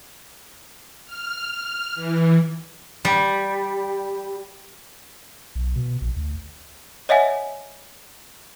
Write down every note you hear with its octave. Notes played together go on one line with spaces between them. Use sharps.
F6
E3
G3
B1
B2
A#1
D2
C#5 D#5 E5 F#5 G#5